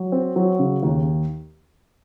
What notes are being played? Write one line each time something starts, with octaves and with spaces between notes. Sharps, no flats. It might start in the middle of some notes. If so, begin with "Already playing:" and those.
Already playing: F#3
C4
F#3
C#3
D#2